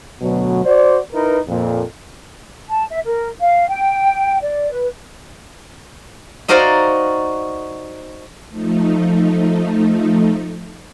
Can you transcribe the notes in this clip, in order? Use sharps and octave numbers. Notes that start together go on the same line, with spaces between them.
D2 B2 F#3
F#4 C5 D5
D#4 E4 A#4 B4
F2 A#2
A5
E5
A#4
F5
G5
D5
B4
D#4 F#4 A#4 C5 D5 F5
F3 A3 D#4